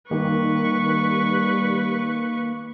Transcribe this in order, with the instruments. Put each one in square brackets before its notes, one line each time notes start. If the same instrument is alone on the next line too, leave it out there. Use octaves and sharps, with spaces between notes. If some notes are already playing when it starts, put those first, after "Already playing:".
[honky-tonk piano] D#3 [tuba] G3 [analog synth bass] A#3 [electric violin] B4 C#6